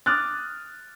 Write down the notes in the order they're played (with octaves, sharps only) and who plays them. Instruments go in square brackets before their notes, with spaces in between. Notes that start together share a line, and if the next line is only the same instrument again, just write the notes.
[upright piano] D6 D#6 F6 F#6 A6